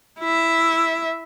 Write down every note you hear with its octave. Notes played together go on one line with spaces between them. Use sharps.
E4 E5